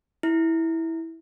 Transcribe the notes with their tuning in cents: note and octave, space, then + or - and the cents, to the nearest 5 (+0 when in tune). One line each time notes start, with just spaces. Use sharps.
E4 -10